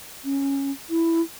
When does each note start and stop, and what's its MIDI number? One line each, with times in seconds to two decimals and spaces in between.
0.25 0.72 61
0.90 1.22 64